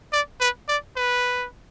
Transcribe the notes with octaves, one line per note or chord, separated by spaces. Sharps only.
D5
B4
D5
B4